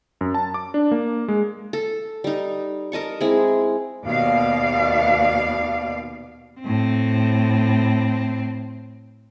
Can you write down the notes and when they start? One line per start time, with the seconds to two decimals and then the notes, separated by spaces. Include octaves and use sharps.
0.21 F#2
0.34 A5
0.54 D6
0.74 D4
0.91 A#3
1.28 G#3
1.73 A4
2.24 G3 D#4
2.92 A#4 D#5 A5 C#6
3.21 G#3 C4 E4 G#4
4.03 D#2 B2 D5 F5
6.61 A2 C4